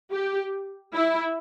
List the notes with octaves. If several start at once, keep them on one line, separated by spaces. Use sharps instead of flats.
G4
E4